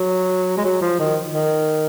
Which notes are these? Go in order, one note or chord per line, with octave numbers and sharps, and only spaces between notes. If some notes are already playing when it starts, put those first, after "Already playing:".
Already playing: F#3
G#3
F#3
F3
D#3
D#3